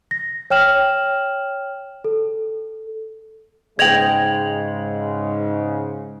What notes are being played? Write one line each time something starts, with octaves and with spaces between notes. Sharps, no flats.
A#6
C#5 G5 F6 E7 F#7
A4
G#2 C#3 G#3 D#5 G5 G#6 F7 F#7